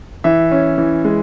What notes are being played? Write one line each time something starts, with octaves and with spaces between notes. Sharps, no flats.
E3 E5
C#4
E3
G#3